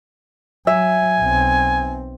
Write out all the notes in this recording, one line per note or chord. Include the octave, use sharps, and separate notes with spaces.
F#3 E5 G#5
B1 C4